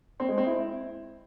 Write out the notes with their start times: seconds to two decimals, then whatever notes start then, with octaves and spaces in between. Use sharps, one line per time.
0.20 C4
0.29 G#3
0.37 C4
0.46 E4